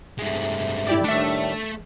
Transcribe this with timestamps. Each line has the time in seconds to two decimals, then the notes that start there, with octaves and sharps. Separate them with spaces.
0.19 G2 C3 G#3 A3
0.87 E4 G4 D5
1.04 A2 D#3 G3 A3 D4 E5